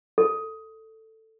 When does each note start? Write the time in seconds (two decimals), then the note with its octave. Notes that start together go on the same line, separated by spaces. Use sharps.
0.18 A4